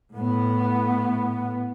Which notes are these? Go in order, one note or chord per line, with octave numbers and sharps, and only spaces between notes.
A2 B3